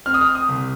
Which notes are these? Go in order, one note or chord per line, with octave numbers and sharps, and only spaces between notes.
C4 F6
D#6
F6
D#6
C2